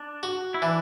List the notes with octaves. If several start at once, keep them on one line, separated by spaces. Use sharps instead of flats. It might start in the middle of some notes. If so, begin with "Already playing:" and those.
Already playing: D4
F#4
E4
E3 D4